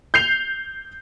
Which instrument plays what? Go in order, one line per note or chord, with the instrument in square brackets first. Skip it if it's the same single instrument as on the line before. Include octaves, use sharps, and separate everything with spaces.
[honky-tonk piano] G6 C7 F7